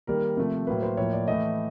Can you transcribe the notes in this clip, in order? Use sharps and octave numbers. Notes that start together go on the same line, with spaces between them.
D#3 G3 A#3 A#4
C3 F3 A3
A2 F#3 A#3 B4
C5
A2 F3 A#3 C#5
D5
A2 E3 A3 D#5